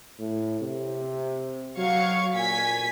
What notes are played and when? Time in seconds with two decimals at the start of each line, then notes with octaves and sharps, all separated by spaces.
0.19 A2
0.61 C3
1.77 F#3 F5 C#6 G#6
2.35 A#2 G#5 G#6 B6